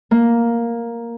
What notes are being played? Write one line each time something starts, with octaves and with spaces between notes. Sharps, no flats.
A#3